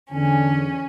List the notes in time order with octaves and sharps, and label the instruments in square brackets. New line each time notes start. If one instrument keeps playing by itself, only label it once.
[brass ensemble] E2 G#5 [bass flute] D3 [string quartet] C#4